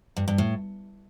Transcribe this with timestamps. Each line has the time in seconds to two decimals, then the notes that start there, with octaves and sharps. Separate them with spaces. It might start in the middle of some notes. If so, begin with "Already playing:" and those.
0.17 G2
0.28 G2
0.38 A2